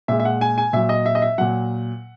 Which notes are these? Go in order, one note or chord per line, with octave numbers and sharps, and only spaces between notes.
A#2 G#3 E5
E5
F#5
G#5
G#5
A#2 F#3 E5
D#5
E5
D#5
E5
A#2 F#3 F#5